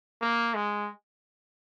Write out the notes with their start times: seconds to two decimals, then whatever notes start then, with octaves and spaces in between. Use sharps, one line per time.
0.21 A#3
0.54 G#3